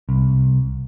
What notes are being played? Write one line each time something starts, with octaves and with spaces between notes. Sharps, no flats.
C2